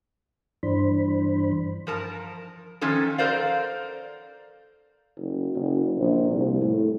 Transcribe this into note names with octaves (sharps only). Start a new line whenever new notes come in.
G2 E3 D4 C5 B5
F3 A#4 A5
D#3 F3 C#4 D#4 A4
A4 A#4 C5 D5 F5
F#1
F#1
A#1
C2
A2